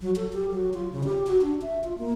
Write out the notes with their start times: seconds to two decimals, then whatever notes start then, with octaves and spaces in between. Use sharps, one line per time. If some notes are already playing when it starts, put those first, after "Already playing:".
0.01 F#3
0.16 A4
0.33 G4
0.51 F#3
0.74 F4
0.92 C#3
1.04 G4
1.27 F#4
1.41 D4
1.62 E5
1.84 F4
1.98 A#3